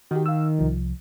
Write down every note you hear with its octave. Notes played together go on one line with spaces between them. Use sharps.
D#3 F#4 G4
F5 E6
C2 F3